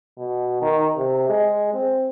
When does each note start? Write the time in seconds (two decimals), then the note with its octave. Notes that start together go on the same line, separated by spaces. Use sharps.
0.18 B2
0.62 D#3
0.97 C3
1.29 G#3
1.74 C4